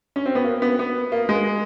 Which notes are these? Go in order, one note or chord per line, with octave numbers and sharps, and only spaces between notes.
C#4
C4
B3
A#3
B3
B3
A#3
G#3